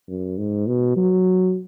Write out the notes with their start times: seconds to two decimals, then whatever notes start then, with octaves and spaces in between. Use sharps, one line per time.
0.09 F#2
0.38 G#2
0.67 B2
0.96 F#3